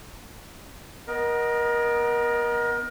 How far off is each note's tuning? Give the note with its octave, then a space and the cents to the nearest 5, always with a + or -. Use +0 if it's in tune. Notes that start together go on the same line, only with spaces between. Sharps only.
B3 +0 A#4 +30 D#5 +0